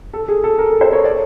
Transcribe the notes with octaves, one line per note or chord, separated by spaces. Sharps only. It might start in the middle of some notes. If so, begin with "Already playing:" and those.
A4
G#4
A4
A#4
C5
C#5
D5